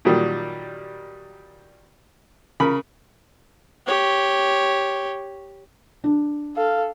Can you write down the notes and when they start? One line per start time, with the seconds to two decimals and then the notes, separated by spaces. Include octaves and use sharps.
0.05 A#2 D#3 F#3 G3
2.60 C#3 A#4 B5
3.86 G4 C#5
6.04 D4
6.56 A4 F5